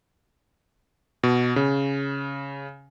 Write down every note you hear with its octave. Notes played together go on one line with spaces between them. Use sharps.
B2
C#3